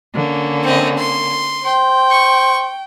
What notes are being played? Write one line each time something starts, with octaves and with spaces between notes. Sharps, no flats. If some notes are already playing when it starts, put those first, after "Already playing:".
D3 A#3 C#4
C4 D#5
C6
C5 G5
C#6